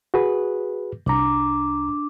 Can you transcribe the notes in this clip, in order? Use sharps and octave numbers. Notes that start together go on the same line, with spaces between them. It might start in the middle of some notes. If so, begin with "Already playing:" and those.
F#4 G#4 B4
C2 D4 A#5 D6